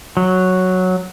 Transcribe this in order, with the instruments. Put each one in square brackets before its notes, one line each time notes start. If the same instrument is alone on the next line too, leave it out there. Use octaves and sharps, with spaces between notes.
[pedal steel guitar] F#3